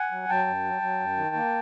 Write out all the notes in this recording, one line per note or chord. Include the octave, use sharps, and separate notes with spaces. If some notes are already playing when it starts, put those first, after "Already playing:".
Already playing: F#5 G#5
F#3
F#3 G5 A5
F#2
F#3
F#3
F#2
D#3
A#3